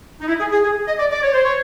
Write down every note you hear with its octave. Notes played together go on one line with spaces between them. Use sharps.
D#4
E4
G#4
G#4
G#4
D#5
D5
D5
C#5
C5
C#5